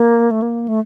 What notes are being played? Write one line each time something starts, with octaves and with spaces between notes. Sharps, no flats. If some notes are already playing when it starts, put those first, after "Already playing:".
Already playing: A#3
A3
A#3
A3